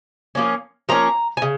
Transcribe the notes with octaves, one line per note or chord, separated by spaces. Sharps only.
F3 A#3 C#4
F3 A#3 C#4 A#5
G#5
C#3